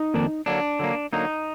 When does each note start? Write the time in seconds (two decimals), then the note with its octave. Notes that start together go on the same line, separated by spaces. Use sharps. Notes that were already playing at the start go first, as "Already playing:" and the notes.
Already playing: D#4
0.14 F2 D#3 A#3 D4
0.46 D3 F#3 A#3 D4
0.79 D3 F#3 A#3
1.13 D3 F#3 A#3 D#4